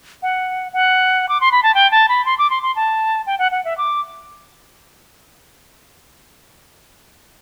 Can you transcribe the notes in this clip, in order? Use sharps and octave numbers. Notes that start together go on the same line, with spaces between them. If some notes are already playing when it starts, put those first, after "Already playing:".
F#5
F#5
D6
C6
B5
A5
G5
A5
B5
C6
D6
C6
C6
A5
G5
F#5
F#5
E5
D6